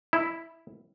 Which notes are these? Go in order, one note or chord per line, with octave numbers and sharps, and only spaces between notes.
E4